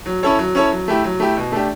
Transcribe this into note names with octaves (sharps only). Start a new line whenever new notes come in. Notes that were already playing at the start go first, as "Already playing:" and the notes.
F#3
C#4 E4 A4 C#5
F#3
C#4 E4 A4 C#5
F#3
A3 E4 G4
F#3
A3 E4 G4
B2
A3 D4 G4